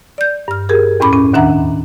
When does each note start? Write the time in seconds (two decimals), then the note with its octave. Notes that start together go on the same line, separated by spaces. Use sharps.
0.18 D5 G6
0.48 G2 F6
0.69 G4 G#4 A#4
1.00 E2 A2 C#4 B5 D6
1.13 C#4
1.33 D#2 D#3 D4 E5 F#5 A#5